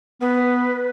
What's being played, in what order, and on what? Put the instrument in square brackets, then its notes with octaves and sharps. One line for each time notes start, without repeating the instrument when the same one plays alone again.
[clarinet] B3 [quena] B4